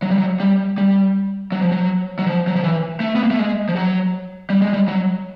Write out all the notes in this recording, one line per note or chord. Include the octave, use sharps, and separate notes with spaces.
F#3
G3
F#3
G3
G3
F#3
F3
F#3
F#3
F3
F#3
F3
E3
A3
B3
A#3
A3
G#3
F3
F#3
G3
G#3
G3
F#3